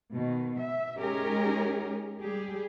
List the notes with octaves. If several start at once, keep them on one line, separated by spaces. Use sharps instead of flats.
B2 D#3
E5
G#3 C#4 D#4 G4 G#4 A#4
G3 G4 G#4